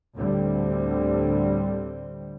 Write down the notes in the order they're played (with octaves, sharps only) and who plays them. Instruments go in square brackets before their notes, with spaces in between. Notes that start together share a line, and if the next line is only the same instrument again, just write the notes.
[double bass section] D2 A2 D3 G3 C4